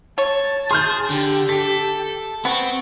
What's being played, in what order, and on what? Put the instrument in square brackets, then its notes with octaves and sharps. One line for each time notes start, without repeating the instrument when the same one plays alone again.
[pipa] C#5 [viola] A5
[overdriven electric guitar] G#4 [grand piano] C6 F6 G6
[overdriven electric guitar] D3 [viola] G4 G5
[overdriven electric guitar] A4 [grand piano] B6
[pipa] B3 [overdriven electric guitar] C4 [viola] C#6